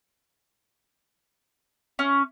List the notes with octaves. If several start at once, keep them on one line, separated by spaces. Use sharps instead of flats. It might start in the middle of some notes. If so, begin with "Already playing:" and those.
C#4